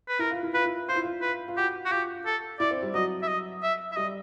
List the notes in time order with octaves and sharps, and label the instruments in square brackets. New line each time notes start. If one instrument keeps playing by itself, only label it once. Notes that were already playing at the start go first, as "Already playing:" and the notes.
[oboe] B4
[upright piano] E4 [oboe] A#4
[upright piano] F4
E4
[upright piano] F4 [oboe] B4
[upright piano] E4
[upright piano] F4 [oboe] C5
[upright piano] E4
F4
[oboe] B4
[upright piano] F4
[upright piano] F#4 [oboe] G4
[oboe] F#4
[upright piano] F4 [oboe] G4
[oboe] A4
[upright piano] E4 [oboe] D5
[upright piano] C4
G3
[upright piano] F#3 [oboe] D#5
[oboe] E5
D#5
E5
E5
[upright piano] G3 [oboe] D#5